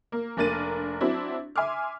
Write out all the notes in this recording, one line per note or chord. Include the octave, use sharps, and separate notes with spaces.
A#3
F1 A#3 D4 A#4 A6 D#7
F#3 C4 D4 E4
E5 G#5 C6 D6 F6